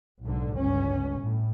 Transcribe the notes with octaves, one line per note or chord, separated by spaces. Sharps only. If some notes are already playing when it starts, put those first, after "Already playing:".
B1 G#2 D3
G1 C#2 C#4
A2